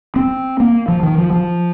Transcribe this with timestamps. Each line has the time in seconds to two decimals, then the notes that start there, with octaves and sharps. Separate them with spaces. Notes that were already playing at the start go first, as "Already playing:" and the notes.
0.16 C4
0.60 A#3
0.88 F3
1.03 D#3
1.18 F3
1.32 F3